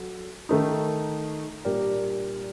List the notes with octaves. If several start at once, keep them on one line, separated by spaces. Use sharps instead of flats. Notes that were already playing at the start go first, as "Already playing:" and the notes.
Already playing: F#3 A4
D#3 A3 D#4
A#2 G3 D4 G4 A#4